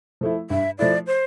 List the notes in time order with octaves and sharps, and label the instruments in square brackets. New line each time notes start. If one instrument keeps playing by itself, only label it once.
[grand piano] F3 A3 E4
[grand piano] G2 [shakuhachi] E5
[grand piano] F3 A3 E4 [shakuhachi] D5
[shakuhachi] C5